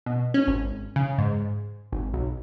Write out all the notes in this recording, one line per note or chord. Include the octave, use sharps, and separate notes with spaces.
B2
C#4
G#1
C#3
G#2
G#1
B1